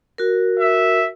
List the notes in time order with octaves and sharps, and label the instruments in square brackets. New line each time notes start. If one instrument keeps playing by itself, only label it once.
[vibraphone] F#4 A#4
[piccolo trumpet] E5